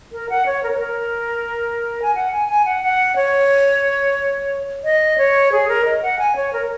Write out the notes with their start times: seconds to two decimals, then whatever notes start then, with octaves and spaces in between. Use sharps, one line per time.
0.12 A#4
0.30 F#5
0.46 C#5
0.63 A#4
0.71 C#5
0.78 A#4
2.02 G#5
2.15 F#5
2.32 G#5
2.49 G#5
2.65 F#5
2.82 F#5
3.16 C#5
4.84 D#5
5.18 C#5
5.52 G#4
5.68 A#4
5.85 D#5
6.02 F#5
6.19 G#5
6.36 C#5
6.53 A#4